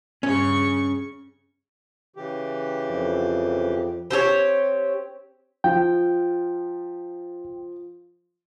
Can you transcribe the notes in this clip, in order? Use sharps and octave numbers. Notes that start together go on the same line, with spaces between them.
G2 C#3 C#4 C#6
C#3 E3 G4
F2
C4 G4 G#4 C#5
F3 G5